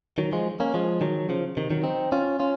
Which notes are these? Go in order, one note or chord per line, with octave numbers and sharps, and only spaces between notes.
D#3 F#3
F3 G#3
A#3 C#4
F3 G#3
D#3 F#3
C#3 F3
C3 D#3
D#3 F#3
C4 D#4
C#4 F4
C#4 F4